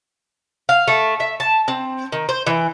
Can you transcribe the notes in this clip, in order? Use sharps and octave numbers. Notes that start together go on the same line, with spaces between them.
F5
A3
E5
A5
C4
D#3
C5
E3